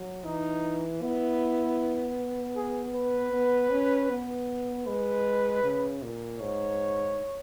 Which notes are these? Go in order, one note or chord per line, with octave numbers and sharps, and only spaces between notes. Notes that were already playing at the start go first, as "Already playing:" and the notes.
Already playing: F#3
E3 D#4
B3 E4
G#4
B4
B3
C#4
B3
G#3 B4
C#3
A#2
G#2 C#5